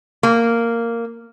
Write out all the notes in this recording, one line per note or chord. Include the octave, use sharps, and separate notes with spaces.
A#3